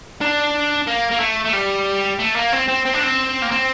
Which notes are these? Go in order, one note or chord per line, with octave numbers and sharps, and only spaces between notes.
D4
A#3
A#3
A3
A3
G3
A3
A#3
C4
C4
C4
D4
C4
A#3
C4